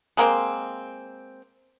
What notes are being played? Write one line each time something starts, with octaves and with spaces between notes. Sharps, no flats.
G#3 A#3 C4